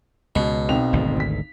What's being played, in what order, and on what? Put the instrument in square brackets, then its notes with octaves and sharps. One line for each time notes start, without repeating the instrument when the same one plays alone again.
[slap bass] C#2 [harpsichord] B2
[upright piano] B1 C4 F7
[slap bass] G#1 D2
[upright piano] B6